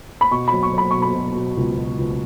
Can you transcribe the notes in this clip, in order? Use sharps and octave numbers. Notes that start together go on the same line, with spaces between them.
B5
B2 C#6
B5
F#3
C#6
F#3
B5
B2 C#6
B5
B2
B2
C#2
B2
C#2